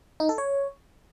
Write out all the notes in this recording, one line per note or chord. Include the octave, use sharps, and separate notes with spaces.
D#4
A4
C#5